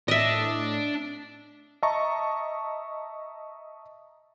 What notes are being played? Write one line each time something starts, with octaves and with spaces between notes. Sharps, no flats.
A2 D4 D#5 E5
D#5 E5 A5 A#5 C#6